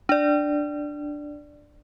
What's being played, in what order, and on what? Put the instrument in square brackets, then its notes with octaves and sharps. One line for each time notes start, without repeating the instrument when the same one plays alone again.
[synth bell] D4 D5